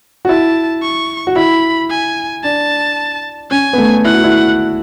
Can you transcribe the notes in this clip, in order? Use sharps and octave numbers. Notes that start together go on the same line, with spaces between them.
F#4
E4 A5
C#6
F#4
E4 B5
G#5
D4 A5
C#4 G#5
B3
A3
E4 F#5
F#4
E4